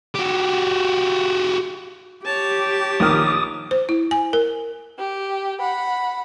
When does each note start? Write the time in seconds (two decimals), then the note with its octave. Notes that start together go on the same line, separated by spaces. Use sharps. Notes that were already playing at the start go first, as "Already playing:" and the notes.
0.14 F#4 G4
2.26 G4 C#5 A5
3.00 A#1 D#3 D6 D#6 F6
3.71 C5
3.89 E4
4.11 G#5
4.33 A#4
4.98 G4
5.59 F#5 B5